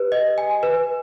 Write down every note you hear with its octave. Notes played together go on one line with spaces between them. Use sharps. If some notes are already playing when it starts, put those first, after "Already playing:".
Already playing: G4 B4
D#5
G#5
B4